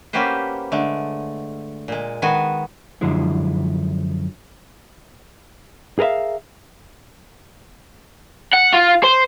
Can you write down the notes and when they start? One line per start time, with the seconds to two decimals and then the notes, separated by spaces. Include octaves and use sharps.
0.13 A#3 C#4 F#4 G4 B4 C5
0.72 D3 G#3 A3
1.88 A#2 G#3
2.22 D#3 G#3 B3 F#4 G#5
3.01 F#2 D3 F3 G#3 E4
5.99 G#4 A#4 B4 E5 F5
8.53 F#5
8.73 F4
9.04 C5